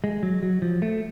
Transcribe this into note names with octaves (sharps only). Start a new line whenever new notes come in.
G#3
F#3
F#3
F3
A3